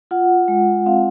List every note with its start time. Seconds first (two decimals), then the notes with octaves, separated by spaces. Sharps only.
0.11 F4 F#5
0.48 G#3
0.86 C4 F5